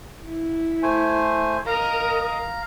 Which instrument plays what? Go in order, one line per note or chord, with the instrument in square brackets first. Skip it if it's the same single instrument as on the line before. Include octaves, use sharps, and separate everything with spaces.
[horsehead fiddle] E4
[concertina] A3 C5 G#5
[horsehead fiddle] A#4 D#5 [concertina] F5 A#5